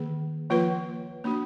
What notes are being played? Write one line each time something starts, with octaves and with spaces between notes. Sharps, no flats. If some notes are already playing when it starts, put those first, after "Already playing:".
Already playing: D#3 A#3 G#4
F3 A#3 F4 B4
A#3 D4 F#4